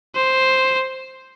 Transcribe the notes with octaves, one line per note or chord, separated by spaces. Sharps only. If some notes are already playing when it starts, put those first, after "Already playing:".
C5